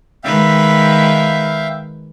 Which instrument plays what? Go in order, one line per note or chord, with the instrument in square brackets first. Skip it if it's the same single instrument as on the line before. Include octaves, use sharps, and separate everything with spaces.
[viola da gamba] D#3 G#3 B4 [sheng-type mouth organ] E5 F5 G5